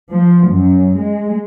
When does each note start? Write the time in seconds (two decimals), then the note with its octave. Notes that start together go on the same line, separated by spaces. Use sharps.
0.11 F3
0.49 F#2
0.99 G#3